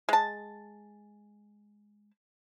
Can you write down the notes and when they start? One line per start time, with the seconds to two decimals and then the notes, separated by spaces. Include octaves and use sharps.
0.09 G#3 A5